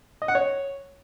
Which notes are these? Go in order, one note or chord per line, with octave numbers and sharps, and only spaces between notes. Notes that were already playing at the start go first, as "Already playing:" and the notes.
D#5
F#5
C#5